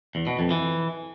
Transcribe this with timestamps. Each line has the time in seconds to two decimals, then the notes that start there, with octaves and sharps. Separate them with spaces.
0.15 E2
0.27 B2
0.39 F2
0.51 E3